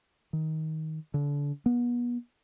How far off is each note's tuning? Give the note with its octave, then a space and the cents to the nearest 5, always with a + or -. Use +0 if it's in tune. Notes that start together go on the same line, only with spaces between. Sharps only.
D#3 +20
D3 -30
B3 -35